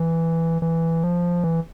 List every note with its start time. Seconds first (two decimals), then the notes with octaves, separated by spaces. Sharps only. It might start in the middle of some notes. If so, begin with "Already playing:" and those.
Already playing: E3
0.62 E3
1.04 F3
1.44 E3